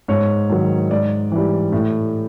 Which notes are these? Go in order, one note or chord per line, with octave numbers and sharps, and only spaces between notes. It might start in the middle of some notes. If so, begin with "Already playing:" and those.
G#2 C#5
D#3 F#3
G#2 D5
E3 G3
A2